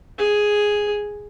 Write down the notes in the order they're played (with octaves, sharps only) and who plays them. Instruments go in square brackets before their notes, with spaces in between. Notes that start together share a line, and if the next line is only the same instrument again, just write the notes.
[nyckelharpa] G#4